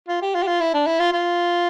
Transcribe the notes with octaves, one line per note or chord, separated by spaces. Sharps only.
F4
G4
F4
G4
F4
E4
D4
E4
F4
F4